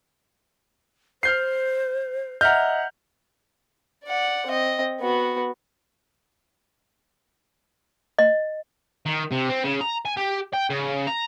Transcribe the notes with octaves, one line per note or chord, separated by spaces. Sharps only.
C5 F6 G6 C7
D#5 E5 F#5 A#5 F6 G6
D5 F#5
C4 D#5
B3 F#4
D#5
D#3
C3
C4
C#3
A#5
G#5
G4
G5
C#3
A#5